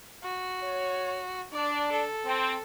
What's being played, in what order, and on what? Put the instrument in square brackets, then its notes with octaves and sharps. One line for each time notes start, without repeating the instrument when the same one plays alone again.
[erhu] F#4
[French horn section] C#5
[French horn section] D4 [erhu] D5
[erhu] A4
[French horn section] C4